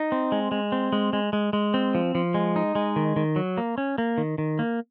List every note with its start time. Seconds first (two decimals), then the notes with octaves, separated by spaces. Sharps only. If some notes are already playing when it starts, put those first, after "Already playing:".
Already playing: D#4
0.12 C4
0.32 G#3
0.52 G#3
0.72 C4
0.93 G#3
1.13 G#3
1.33 G#3
1.53 G#3
1.74 C4
1.95 F3
2.15 F3
2.34 G#3
2.56 D#4
2.75 G#3
2.96 D#3
3.16 D#3
3.36 F#3
3.58 A#3
3.78 C#4
3.98 A#3
4.18 D#3
4.38 D#3
4.59 A#3